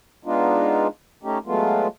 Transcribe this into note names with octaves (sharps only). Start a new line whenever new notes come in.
G#3 B3 D4 D#4 F4
A3 C#4 D#4 G4
F#3 G#3 A3 B3 F4